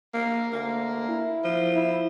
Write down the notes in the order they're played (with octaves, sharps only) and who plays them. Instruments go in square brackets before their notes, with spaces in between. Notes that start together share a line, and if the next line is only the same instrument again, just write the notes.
[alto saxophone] A#3
[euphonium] D2 [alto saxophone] A#3
[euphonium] E4
[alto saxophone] F3
[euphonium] E4